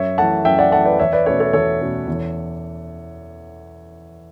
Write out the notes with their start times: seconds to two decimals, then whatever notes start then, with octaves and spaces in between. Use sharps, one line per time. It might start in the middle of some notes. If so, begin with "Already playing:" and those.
Already playing: F#2 C#5 E5
0.18 E3 A3 F#5 A5
0.45 F#2 E5 G5
0.59 D5 F#5
0.72 E3 A3 F#5 A5
0.85 B4 D5
0.99 E2 C#5 E5
1.13 B4 D5
1.26 B2 A3 C#4 A4 C#5
1.40 A4 C#5
1.53 E2 A4 C#5
1.81 B2 A3 C#4
2.08 E2